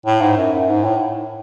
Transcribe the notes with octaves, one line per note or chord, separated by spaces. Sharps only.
A2
G#2
F#2
F#2
G#2
A2